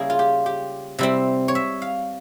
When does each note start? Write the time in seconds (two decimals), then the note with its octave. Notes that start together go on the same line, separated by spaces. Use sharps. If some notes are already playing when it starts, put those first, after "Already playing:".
Already playing: C#3 G3 A#3 E4 G#4
0.10 F4
0.19 G4
0.46 G4
0.99 C3 G3 C4 E4
1.48 C#5
1.55 E5
1.82 F5